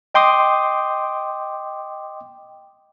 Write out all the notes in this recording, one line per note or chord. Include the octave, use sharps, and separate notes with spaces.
D#5 G5 C6 D6 D#6